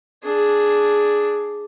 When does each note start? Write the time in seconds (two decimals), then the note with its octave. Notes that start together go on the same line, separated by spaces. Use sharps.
0.24 D4 G#4